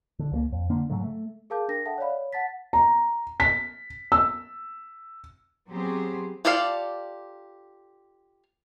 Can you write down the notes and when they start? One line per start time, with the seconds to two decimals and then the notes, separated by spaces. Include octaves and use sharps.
0.19 D3
0.32 C#2 F#3 A#3
0.52 F2
0.70 D3 A#3 D4
0.90 G#2 C#3 F#3 A3
1.04 A3
1.50 G#4 A#4 F5 A5 D6 G6
1.68 D4 A#4 A#6
1.85 A4 E5 F#5 G5 A5
1.98 C#5 D5 F5 B5
2.09 C#5
2.33 F#5 A5 A6 B6
2.73 A#5
3.40 B6
4.12 E6
5.69 F#3 B3 C4 G4 G#4 C5
6.45 F4 G4 A4 D5 F5